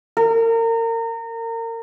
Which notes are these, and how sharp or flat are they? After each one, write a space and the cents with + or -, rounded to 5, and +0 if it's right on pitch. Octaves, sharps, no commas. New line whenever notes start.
A#4 -30